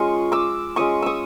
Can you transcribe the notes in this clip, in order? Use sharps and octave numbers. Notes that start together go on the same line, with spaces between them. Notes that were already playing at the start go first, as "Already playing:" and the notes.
Already playing: G#3 C#4 F4 C#6 D#6
D6 E6
G#3 C#4 F4 C#6 D#6
C#6 D#6 E6